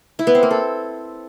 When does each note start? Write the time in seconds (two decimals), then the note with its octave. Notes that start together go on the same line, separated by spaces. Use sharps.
0.19 E4
0.27 B3
0.35 C4
0.43 A#3
0.51 A4